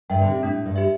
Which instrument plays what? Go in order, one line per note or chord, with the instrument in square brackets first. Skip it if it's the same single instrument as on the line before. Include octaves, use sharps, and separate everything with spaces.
[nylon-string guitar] G2 [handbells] E5 G5
[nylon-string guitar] D3
C3
[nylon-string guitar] A2 [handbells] D4
[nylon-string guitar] G2
[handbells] G4 E5